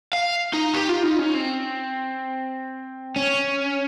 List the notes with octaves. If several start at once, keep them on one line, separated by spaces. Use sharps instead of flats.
F5
D#4
G4
F4
D#4
C#4
C4
C#4